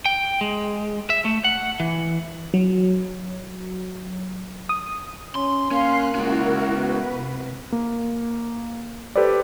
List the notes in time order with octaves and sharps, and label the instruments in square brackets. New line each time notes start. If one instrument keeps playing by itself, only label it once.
[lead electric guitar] G5
G#3
E5
A3
F#5
E3
[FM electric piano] F#3
D#6
[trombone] C#4 [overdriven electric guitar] C6
[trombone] A#3 [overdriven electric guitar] C#4 [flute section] F5 C6 [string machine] F#6
[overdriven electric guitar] G#3 C#4 [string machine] E4 A#4 [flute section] F#4
[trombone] B3 [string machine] B4
[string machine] C3
[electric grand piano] A#3
G4 A4 B4 C5 D5